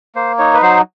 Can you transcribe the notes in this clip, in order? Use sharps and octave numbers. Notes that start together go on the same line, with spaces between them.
A#3 C5
D#4 C#5
B4
F#3 C5